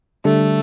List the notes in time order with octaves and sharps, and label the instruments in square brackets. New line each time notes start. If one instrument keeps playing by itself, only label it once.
[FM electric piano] D3 G3 D4 A4 [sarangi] A3